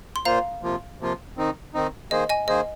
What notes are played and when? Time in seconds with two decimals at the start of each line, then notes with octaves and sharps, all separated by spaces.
0.16 C6
0.25 A#2 A#3 F4 C5 F5 A#5
0.63 C3 F3 A#3 F4
1.00 C3 F3 A#3 F4
1.37 D#3 C4 D#4
1.74 D#3 C4 D#4
2.11 D#3 A#3 G#4 C5 D#5
2.29 D#5 G#5
2.48 D#3 A#3 G#4 C5 D#5